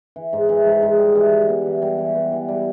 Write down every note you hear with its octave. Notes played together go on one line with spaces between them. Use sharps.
E3
G#2
E3
G#2
G#2
G3
E3
G3
B3
E3
G3
E3
B3
E3
G3